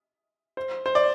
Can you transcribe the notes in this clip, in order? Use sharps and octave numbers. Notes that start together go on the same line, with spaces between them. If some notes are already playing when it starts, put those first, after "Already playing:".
C5
C5
D5